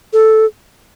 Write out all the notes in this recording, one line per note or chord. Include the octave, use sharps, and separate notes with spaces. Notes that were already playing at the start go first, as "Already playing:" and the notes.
A4